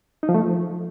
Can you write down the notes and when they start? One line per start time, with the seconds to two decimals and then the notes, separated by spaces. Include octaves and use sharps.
0.23 D#4
0.29 F3
0.34 A3
0.40 F3